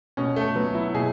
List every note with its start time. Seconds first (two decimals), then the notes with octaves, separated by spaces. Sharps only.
0.17 B2 C#4
0.36 A3
0.55 F#3 B3
0.75 E4
0.94 B2 G#4